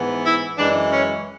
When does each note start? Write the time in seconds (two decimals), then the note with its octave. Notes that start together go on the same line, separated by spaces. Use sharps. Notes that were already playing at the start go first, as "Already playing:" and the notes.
Already playing: G#2 E3 B3
0.24 E4
0.57 F#2 E3 G#3 D4
0.92 C#4